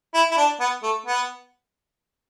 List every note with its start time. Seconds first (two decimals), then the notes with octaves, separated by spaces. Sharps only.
0.14 E4
0.31 E4
0.37 D4
0.60 B3
0.83 A3
1.06 B3